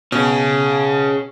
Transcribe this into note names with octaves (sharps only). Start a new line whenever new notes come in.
B2 C#4 G#4